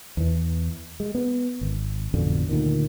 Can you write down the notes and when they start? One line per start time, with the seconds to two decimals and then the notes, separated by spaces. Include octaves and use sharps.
0.17 E2 E3
1.00 G#3
1.15 B3
1.61 G#1
2.14 A1 F2 B2 D3
2.49 D2 A#2 D#3